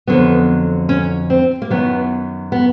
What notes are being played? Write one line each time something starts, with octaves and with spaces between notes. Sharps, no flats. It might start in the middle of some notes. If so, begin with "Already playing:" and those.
F2 D3 F#3 B3
C#4
C4
A#3
F#2 D#3 F#3 B3
B3